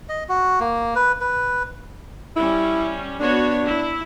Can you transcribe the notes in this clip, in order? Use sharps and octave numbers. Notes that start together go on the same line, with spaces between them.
D#5
F#4
A#3
B4
B4
G3 C#4 E4
B3 D4 F#4 C#5
E4